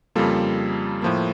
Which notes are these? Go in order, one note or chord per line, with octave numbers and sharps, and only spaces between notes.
F2 C#3 G3 A#3 F4 A4
A2 F3 A#3